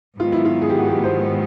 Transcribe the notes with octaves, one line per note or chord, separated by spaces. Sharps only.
G#2 D#3 F#3 B3 F4
E4
F4
G#4
G4
F#4
G4
C5